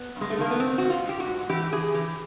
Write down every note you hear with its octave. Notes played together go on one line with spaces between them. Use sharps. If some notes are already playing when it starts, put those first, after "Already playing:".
Already playing: B3
G2
G#3
A3
D#3 A#3
B3
G#2 C4
G#2 F#4
F4
G#2 G4
F#4
G#2
E3 G4
E3 G#4
E3 G4